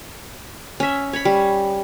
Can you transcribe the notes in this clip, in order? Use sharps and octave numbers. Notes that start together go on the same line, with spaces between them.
C#4 E5
C#5 B5
G3